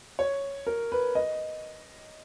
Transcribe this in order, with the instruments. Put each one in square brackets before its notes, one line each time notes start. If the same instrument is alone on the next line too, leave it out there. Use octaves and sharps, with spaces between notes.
[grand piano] C#5
A#4
B4
D#5